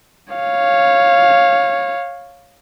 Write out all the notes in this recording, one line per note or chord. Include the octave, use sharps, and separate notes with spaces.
C#5 F5